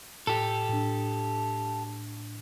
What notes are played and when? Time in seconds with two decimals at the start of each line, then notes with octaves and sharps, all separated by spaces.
0.27 A2 G4 A4
0.70 A2 D4